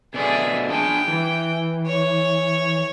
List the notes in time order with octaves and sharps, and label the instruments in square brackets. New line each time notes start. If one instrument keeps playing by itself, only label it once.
[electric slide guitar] B2 D3 D5 [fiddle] G#4 E5
[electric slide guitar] D4 G#4 G#5 [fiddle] G5
[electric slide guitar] E3
[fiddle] C#5